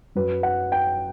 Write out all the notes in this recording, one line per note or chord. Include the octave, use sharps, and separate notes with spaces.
F#2 F#3 B4
F#5
G5